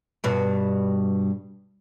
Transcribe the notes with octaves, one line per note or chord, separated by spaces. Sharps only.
G2 B2